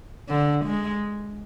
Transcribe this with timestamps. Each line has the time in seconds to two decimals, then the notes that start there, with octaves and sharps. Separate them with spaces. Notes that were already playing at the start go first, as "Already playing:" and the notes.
0.28 D3
0.65 G#3